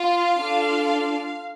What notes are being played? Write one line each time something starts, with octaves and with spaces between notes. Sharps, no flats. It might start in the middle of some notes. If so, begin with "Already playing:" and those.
Already playing: F4 F5
D4 F4 A4